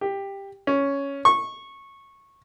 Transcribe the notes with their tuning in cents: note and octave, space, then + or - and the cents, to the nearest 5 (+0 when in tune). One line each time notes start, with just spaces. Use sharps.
G4 +10
C#4 +5
C#6 -15